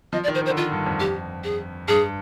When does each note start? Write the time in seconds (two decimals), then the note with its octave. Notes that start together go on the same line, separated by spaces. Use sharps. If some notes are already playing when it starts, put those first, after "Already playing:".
0.13 F3 D#5
0.23 D5
0.28 D#3
0.35 C5
0.41 D#3
0.46 C5
0.50 D3
0.57 D#3 F4
0.72 G2
0.86 F2
1.00 G4
1.44 G#4
1.88 G2 G#4